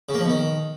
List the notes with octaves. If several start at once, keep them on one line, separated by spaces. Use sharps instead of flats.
C#3
A#3
F3
B2
D#3